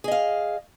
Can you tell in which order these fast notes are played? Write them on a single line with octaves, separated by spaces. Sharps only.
G#4 D#5 F5